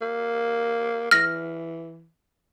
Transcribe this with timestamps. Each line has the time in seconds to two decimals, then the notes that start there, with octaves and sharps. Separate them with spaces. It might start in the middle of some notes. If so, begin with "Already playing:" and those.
0.01 A#3
1.11 E3 F6 A#6